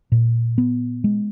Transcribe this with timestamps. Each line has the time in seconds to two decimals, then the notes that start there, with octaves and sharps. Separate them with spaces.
0.12 A#2
0.58 B3
1.04 G#3